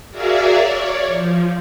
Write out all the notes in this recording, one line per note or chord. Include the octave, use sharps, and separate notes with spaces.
F#4 G#4 A#4 D5 E5 F5
C#5 D5
F3